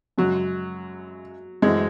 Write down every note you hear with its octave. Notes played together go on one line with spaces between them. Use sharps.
F#2 C#3 F#3 G#3
F#2 E3 G#3 A3 C4 F#4